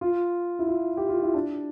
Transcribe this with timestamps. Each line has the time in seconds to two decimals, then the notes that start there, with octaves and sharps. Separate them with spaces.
0.01 F4
0.59 E4
0.67 F4
0.97 G4
1.09 F4
1.22 E4
1.34 D4